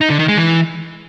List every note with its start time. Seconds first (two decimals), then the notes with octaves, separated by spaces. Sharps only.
0.01 D#4
0.10 D3
0.19 D#3
0.28 G#3
0.38 E3